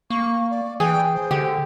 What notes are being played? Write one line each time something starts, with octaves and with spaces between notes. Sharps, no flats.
A#3 C#6
D5
E3 G#4 G5
C5
D3 G4